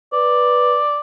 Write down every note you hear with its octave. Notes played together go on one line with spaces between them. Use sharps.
B4 D5